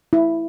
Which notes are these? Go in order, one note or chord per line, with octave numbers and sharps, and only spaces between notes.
E4